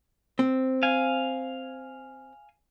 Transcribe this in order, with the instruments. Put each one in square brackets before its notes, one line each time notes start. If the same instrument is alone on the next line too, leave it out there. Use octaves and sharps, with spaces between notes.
[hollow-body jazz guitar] C4
[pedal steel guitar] F5 G#5